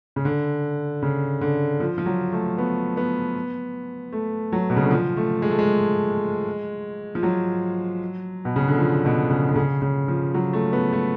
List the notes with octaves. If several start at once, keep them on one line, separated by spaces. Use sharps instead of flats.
C#3
D3
C#3
D3
F3
F3
F#3
A3
B3
B3
A3
F#3
B2
C#3
D3
F3
A3
G#3
A3
G#3
F3
F#3
B2
C#3
D3
F3
B2
C#3
D3
C#3
C#3
F3
F#3
A3
B3
A3